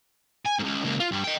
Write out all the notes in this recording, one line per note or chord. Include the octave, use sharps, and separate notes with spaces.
G#5
C#2 G#2
C#2 A#3
F4
G2 G3
D#5 G5